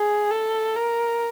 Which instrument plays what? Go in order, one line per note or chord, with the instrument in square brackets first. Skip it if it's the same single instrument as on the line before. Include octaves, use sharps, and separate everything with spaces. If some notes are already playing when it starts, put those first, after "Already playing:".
Already playing: [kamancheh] G#4
A4
A#4